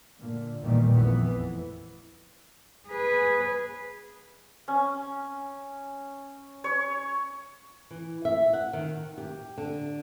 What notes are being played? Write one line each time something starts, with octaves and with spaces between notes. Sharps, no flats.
A#2 D3
A#1 E2 A#2 D#3 E3 G3
A1 F2 E3 B3
E3
G#4 B4
C#4
C#5
E3
E5
F#5
D#3
G4
D3